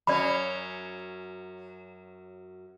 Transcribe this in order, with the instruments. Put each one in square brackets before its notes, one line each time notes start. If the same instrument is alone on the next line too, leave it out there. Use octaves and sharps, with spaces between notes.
[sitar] F#2 F#3 C#4 [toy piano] D5 B5